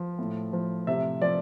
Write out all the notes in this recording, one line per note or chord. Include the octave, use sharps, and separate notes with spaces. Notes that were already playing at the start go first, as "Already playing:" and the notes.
Already playing: F3
A2
F3
C3 E5
F3 D5